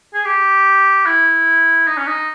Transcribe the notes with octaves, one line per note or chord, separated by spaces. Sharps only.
G#4
G4
E4
D#4
C#4
D#4